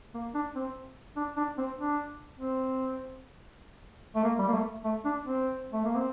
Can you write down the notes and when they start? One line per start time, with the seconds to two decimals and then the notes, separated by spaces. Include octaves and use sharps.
0.14 A#3
0.34 D4
0.55 C4
1.17 D4
1.37 D4
1.58 C4
1.79 D4
2.39 C4
4.16 A3
4.23 A#3
4.39 G3
4.48 A#3
4.53 A3
4.84 A3
5.05 D4
5.25 C4
5.73 A3
5.85 A#3
5.95 C4